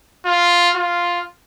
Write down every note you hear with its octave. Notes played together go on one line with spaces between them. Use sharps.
F4
F4